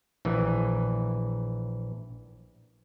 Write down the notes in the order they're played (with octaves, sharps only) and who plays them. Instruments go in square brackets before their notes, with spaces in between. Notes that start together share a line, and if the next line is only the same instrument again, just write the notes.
[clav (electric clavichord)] A#1 E3